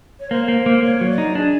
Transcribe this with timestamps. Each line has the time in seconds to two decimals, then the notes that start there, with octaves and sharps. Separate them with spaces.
0.19 C#5
0.30 A#3 C5
0.48 A#3
0.66 A#3
0.82 A#3 C#5
1.01 F#3
1.10 D5
1.18 D#4
1.35 D4 G#4